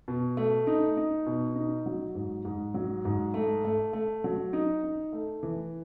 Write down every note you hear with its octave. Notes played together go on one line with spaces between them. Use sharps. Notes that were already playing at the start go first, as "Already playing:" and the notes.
B2
A3
D#4
D#4
B2
D#4
F#3
G#2
G#2
F#3
G#2
A3
A3
A3
F#3
D#4
D#4
A3
E3